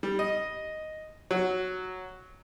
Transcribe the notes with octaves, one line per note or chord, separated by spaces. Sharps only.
G3
D#5
F#3